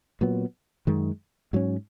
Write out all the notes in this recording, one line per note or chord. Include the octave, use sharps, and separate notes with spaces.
A#2 F#3 B3
F#2 D#3 G#3
G#2 F#3 C#4